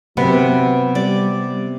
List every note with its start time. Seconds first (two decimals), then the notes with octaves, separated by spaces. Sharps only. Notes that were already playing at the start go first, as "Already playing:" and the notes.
0.17 C3 F#3 B3
0.95 G3 D5